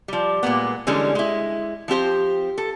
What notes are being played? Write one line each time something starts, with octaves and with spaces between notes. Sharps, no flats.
F3 G3
A#2 G#3 A#3 B3
D3 E3 G3 G#3 C#4 G#4
G#3 E4
F3 C4 G4 C5
A4